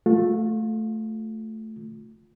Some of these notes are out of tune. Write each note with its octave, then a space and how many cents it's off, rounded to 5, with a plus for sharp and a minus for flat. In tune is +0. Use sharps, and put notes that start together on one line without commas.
A3 +0 F4 +25